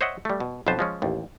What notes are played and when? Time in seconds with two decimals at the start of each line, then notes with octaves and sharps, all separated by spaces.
0.01 C5 C#5 D#5 E5 F#5
0.25 G3 A3
0.40 B2
0.67 B1 F2 B2 B4 C5 A5
0.79 F3 G#3 C#4
1.02 A1 D#2